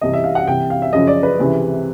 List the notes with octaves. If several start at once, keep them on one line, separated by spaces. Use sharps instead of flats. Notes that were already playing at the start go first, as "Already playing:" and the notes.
C2 C3 E3 D#5
E5
F5
F#5
C2 C3 E3 G5
F5
E5
F#2 C#3 F3 D#5
D5
B4
C#2 C3 E3